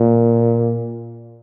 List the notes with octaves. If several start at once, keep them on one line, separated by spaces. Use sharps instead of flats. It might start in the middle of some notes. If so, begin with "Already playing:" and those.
Already playing: A#2